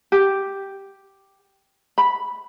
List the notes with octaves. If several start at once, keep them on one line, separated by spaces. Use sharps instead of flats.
G4
B5